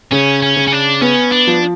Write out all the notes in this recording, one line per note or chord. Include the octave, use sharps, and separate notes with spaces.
C#3 C#4
C#4
C#3
C#4
D4
B3 C#4
D4
F3